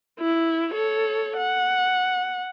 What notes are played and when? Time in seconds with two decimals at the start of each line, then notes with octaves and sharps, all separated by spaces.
0.20 E4
0.71 A4 C#5
1.37 F#5